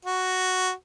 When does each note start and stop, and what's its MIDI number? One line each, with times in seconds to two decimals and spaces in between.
0.05 0.72 66